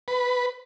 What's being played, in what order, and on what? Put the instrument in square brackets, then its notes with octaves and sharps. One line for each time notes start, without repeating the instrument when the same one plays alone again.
[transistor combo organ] B4